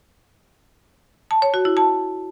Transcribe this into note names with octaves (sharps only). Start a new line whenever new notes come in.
A5
C#5
F#4
E4
A5